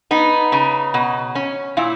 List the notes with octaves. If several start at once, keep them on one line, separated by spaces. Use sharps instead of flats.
B3 D#4
C#3
B2
C#4
A#2 E4